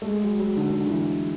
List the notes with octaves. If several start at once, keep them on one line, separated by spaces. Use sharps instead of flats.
A3
G#3
F#3
F#3
D3
D3
E3